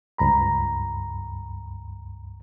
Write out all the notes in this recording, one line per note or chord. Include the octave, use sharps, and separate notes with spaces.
C#2 G2 A#5 B5